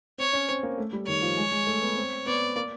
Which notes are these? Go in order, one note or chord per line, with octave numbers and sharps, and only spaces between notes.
C4 C#5
C#4
C4
A#3
A3
G3
D#3 C#5
F3
G#3
G#3
A3
B3
C4
B3 D5
A#3